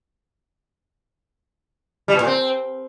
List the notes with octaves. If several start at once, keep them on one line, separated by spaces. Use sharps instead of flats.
G3
B2
A#2
C4